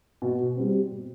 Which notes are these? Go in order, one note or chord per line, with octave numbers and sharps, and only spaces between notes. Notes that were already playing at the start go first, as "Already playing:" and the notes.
B2
G3 C4
B2